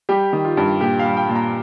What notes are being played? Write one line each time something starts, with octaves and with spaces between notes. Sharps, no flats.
G3 G4
D#3
F4
G2
A#2 G4
F5
G3
G5
A#2
A#5